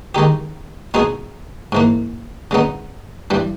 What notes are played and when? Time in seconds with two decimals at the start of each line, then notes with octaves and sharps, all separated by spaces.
0.15 D#3 G#3 D#4 G4
0.94 B2 G#3 D#4 G#4
1.72 G#2 E3 A#3
2.51 C#3 G#3 B3 D#4
3.30 G2 E3 G3